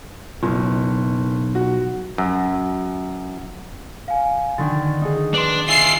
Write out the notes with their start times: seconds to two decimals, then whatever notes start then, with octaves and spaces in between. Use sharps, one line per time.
0.43 F#1 B1
1.55 F#4
2.18 F#2
4.08 F5 G#5
4.58 D3 D#3 G#5 A6
5.01 D#4 G#4
5.34 D4 B4 C6
5.68 F4 E5 G#5 C7